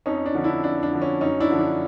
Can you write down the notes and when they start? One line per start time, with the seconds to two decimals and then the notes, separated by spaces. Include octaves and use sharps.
0.06 F2 C#4 D#4
0.26 D4
0.34 D3 F3
0.44 D4 E4
0.63 F2 D4
0.83 D4
0.92 D3 F3
1.02 C#4
1.21 F#2 C#4 D#4
1.40 D4 E4
1.51 D3 F3
1.59 D4